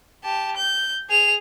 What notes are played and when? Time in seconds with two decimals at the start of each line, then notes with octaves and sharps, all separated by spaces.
0.24 G4 A5
0.56 G6
1.10 G#4 F7